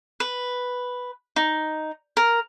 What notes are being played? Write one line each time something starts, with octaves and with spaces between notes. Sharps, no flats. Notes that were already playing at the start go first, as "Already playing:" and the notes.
B4
D#4
A#4